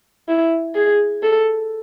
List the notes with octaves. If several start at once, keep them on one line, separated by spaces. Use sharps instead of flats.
E4
G#4
A4